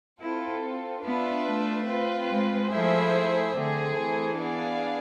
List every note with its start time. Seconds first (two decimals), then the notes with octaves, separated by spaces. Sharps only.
0.21 C4 E4 F4 A4
1.05 B3 D4 F4 B4 E5
1.47 A3
1.88 C4 F4 B4
2.29 G#3
2.71 F3 A3 E4 G#4 C5 E5
3.54 D3 A3 C4 G#4
3.95 E3
4.37 B3 D4 G#4 D5 F5